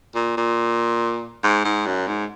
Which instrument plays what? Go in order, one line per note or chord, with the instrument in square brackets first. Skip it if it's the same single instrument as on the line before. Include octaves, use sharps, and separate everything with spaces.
[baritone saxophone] A#2
A#2
G#2
G#2
F#2
G#2